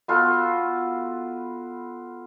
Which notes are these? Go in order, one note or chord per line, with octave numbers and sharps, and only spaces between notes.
B3 F4 F#4 A4